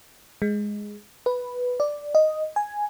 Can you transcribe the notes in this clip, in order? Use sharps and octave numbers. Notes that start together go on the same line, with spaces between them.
G#3
B4
D5
D#5
G#5